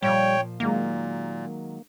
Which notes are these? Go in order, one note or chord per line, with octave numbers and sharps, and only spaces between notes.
A#2 F3 G3 C#5 G5
A#2 D#3 F#3 G#3 A#3